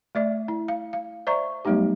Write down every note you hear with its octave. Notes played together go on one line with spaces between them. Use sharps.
A3 D5 E5
E4
F5
F5
C5 D5 E5 A#5 C#6
F#3 G3 A3 B3 D#4 G4